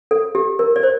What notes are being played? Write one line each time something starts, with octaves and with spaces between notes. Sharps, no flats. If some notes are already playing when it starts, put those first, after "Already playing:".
A4
G4
A#4
D5
C5